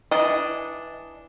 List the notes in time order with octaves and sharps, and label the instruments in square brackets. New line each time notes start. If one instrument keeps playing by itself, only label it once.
[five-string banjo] E3 D4 D#5